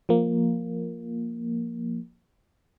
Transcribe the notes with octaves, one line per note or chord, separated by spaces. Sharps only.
F3 A#3